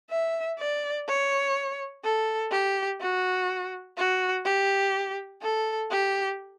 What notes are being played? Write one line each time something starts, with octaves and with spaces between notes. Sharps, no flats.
E5
D5
C#5
A4
G4
F#4
F#4
G4
A4
G4